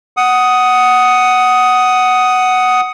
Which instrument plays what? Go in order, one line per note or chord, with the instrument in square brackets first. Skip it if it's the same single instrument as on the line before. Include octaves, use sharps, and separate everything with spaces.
[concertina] F#5 D#6